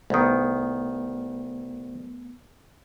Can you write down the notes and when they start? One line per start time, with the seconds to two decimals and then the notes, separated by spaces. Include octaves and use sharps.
0.10 C2 D#3 A3 B3